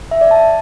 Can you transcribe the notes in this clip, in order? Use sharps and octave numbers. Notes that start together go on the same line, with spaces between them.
E5
D5
A5